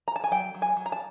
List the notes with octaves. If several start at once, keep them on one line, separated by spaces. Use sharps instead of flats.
A#5
A5
G#5
F#3 G5
F#3
G#5
F#3
A#5
A5